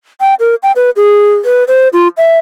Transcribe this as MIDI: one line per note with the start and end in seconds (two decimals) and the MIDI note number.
0.21 0.35 79
0.40 0.55 70
0.63 0.72 79
0.76 0.90 71
0.96 1.34 68
1.45 1.64 71
1.68 1.88 72
1.93 2.08 65
2.17 2.39 76